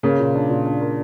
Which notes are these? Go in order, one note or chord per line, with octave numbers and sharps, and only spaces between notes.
C#3 A#3
A#2
D4
A#2
D4
A#3